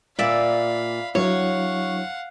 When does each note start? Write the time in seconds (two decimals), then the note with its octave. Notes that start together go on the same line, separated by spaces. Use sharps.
0.19 A#2 D5 E5 F5 B5
1.15 F#3 D4 E4 C#5 F5 F#5